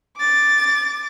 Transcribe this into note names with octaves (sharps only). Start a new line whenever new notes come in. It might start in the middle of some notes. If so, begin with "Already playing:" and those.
D6 A6